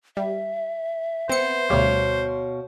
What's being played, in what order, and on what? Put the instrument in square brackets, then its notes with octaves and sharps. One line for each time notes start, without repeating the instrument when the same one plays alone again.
[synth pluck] G3 [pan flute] E5
[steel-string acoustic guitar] B3 [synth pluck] C4 C#7 [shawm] C5
[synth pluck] D2 G3 [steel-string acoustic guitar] B2 C#5 F5